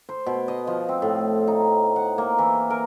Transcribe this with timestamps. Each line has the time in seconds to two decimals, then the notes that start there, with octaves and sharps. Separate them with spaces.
0.09 C5
0.26 B2
0.48 D#5
0.67 F3
0.89 C4
1.02 A2
1.47 D#4
1.96 F#5
2.18 A#3
2.38 E3
2.70 A#4